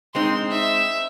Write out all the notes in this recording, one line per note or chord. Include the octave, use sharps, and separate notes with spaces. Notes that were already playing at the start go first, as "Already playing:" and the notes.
G#3 C4 D#4 C6
E5